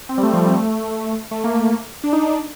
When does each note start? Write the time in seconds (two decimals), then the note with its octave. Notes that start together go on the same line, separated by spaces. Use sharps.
0.09 C4
0.18 G3
0.23 A3
0.33 F3
0.44 G3
0.54 A3
1.31 A3
1.44 A#3
2.04 D4
2.13 D#4
2.23 D4
2.33 D4